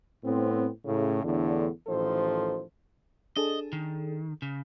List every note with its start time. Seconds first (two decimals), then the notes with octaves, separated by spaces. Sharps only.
0.24 A2 B3 C4
0.85 A2 C#3
1.24 E2 A2 D3
1.88 A1 D#3 F3 A4 C5
3.37 D4 G#4 A4 D#5
3.73 D#3
4.42 C#3